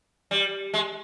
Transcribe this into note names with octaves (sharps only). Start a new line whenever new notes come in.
G3
G#3